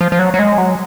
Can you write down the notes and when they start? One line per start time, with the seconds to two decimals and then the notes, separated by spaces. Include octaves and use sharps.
0.01 F3
0.12 F3
0.19 F#3
0.34 F#3
0.39 G#3
0.58 F#3